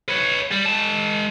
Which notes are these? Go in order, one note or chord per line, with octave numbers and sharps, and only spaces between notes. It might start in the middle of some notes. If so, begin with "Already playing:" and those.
B4 C#5
G3
G#3 A5